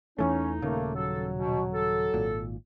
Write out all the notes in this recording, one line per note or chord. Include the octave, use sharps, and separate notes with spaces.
E2 E3 A3 C#4 D#4
D#1 C#3 A3 A#3
F#3 A4
B2
A4
G#1 A#2